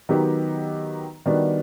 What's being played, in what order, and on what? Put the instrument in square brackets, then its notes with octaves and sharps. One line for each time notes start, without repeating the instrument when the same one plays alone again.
[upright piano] D#3 F#3 B3 D#4 G4
D#3 G3 B3 D4 F#4